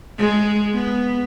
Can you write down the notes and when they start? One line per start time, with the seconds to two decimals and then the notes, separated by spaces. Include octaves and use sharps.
0.19 G#3
0.74 B3